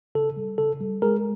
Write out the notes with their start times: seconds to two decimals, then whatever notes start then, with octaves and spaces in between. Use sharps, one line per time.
0.15 C#3 A4
0.37 G3
0.58 C#3 A4
0.80 G3
1.02 G#3 G#4 A#4